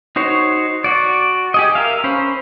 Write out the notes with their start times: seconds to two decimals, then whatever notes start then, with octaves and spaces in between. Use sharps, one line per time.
0.16 D#4 F#4 C5 C#5
0.84 F#4 D5
1.54 G4 G#4 D#5
1.75 A#4 E5 F5
2.04 C#4 C5 B5